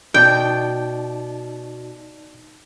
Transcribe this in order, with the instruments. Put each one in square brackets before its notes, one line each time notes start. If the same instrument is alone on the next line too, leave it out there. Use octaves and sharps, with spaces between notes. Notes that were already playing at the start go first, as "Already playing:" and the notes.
[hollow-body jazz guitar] B2 [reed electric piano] D#4 D5 A5 [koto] G5